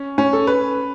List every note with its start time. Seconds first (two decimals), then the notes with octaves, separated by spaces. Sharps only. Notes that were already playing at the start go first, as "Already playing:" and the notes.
Already playing: C#4
0.18 C#4
0.33 A4
0.47 B4